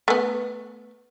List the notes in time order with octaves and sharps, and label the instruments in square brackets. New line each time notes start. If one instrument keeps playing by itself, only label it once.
[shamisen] A3 B3